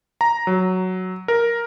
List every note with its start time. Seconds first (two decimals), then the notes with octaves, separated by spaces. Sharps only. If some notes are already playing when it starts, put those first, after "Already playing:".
0.21 A#5
0.47 F#3
1.28 A#4